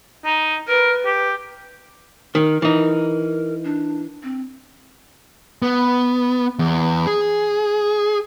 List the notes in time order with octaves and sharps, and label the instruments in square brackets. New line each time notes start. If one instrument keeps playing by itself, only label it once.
[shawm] D#4 [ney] A#5
[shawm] A#4 [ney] B4
[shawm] G4
[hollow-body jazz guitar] D#3 [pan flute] A#4
[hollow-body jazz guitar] E3 D#4
[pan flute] D4
C4
[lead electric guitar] B3
E2
G#4